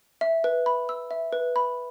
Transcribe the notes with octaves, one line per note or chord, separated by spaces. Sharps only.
E5
B4
B5
E6
E5
B4
B5